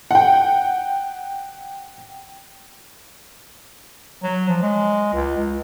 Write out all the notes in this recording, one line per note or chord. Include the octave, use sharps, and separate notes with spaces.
F#5 G5
F#3
F3
G#3
C#2
C#2